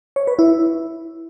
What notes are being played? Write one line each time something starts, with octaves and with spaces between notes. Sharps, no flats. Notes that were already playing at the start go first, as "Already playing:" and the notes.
C#5
B4
E4